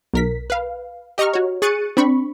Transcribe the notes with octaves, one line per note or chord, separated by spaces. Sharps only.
B1 A#4 B6
B4 F5
G4 D#5 A#5 C#6 F6
F#4 C#5
G#4 C#6 F#6 A6 C#7 D#7
C4 D4 B5 C#6